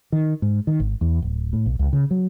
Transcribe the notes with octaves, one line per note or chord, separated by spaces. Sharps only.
D#3
G#2
D#3
G#1
E2
D1
A2
B1
C#2
C#3
F#3